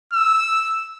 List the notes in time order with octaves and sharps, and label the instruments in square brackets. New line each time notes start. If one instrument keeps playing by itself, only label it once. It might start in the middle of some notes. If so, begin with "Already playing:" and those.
[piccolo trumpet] E6